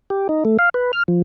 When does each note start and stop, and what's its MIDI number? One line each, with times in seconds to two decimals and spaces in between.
0.10 0.28 67
0.29 0.44 63
0.45 0.57 57
0.59 0.69 77
0.74 0.92 71
0.93 1.03 89
1.08 1.22 53